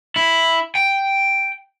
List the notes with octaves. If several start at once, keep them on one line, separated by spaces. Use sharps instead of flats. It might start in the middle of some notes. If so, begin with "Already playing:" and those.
E4
G5